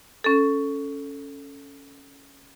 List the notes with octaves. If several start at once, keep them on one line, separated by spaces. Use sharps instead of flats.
C#4 A4